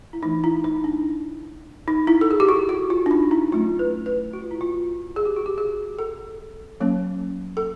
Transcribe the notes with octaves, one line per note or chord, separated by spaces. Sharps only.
E4
E3 A3 D4 D#4
E4
D#4
D4
D#4
E4
A4
G#4
G4
F#4
F#4
F4
D4
D#4
E4
F#3 A3 C#4 F4
B4
B4
F#4
F4
E4
F4
G#4
G4
F#4
G4
G#4
A4
F#3 A#3 C#4
A4